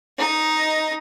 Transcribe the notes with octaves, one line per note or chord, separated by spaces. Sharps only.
D#4 D#5